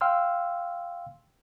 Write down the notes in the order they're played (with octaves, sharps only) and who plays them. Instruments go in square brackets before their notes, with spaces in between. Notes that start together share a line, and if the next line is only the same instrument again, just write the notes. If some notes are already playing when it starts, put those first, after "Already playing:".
[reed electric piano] F5 G5 C6 E6 F6